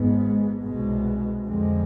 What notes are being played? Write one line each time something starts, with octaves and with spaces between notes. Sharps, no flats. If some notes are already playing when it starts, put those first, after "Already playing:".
Already playing: G#1 G#2 G#3 B3
C2 B2 G#3
F2 D3 F3 G#3 C4